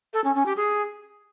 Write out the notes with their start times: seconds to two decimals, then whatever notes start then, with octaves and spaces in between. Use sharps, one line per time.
0.14 A4
0.24 C#4
0.35 C#4
0.46 G4
0.57 G#4